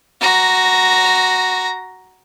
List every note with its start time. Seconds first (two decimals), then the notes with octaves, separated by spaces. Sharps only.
0.21 F#4 A#5